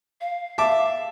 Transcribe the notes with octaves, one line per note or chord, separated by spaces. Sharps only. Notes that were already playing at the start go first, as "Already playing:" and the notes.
F5
E5 A5 D6